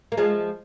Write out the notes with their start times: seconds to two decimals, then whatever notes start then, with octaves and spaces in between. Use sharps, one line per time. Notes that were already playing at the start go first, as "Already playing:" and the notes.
0.12 A#3
0.17 F3 G#3